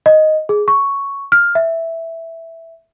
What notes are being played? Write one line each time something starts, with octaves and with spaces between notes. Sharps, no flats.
D#5
G#4
C#6
F6
E5